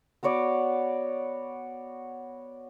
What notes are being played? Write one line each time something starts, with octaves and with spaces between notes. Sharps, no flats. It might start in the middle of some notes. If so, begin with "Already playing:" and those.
B3 F#4 C#5 D5